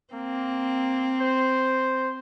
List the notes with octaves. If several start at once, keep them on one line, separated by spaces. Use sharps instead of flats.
A#3 C4
C5